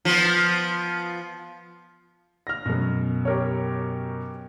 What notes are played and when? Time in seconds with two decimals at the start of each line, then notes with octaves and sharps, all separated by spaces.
0.05 F3 B3
2.47 F6 A#6
2.66 F#2 B2
3.25 G4 A#4 C#5